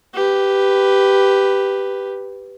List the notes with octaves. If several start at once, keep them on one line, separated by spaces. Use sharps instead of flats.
G4 B4